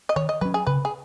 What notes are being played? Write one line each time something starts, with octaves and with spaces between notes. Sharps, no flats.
D#5
D#3 C#5
D#5
F#3 C#4 B4
G#4
C#3 B4
G#4